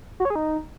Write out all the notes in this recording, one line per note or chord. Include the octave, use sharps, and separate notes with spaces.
F#4
C#5
G#4
D#4